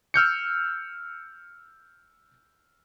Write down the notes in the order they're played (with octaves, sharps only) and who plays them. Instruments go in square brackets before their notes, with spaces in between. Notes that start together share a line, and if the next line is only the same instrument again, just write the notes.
[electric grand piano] E6 F6 G6 C#7